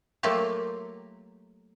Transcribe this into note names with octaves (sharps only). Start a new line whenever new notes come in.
F#3 A3 A#3 F4 G4